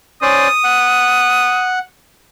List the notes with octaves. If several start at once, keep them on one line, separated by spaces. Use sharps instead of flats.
C#4 C5 D5 D#6
F#5